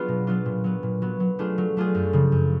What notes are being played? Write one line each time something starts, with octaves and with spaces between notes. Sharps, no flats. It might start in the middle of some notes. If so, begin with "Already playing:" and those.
Already playing: F#3 B3 D4 F4 G#4
B2
F#3 B3 D4 F4
A#2
F#3 B3
A#2
F#3 B3
F#3
A3 D4 F4 G#4
F#3
A3 D4 F4 G#4
F#2
C#3 F3
F#2